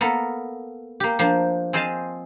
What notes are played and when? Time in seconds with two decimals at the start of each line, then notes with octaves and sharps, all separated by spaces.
0.01 A#3 B3 A4 A#4
1.00 A#3 G4
1.19 F3 A#3 D4
1.73 C4 G#4 C5 D#5 F5 A5